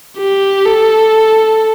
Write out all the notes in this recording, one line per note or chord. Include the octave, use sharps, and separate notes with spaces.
G4
A4